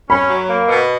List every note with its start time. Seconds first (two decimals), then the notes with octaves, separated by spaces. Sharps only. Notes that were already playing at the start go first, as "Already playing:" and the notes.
0.09 C#4 B5
0.29 F#3
0.49 A#3
0.68 B2